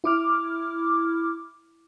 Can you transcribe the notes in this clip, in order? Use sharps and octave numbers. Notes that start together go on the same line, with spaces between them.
E4 D6 F6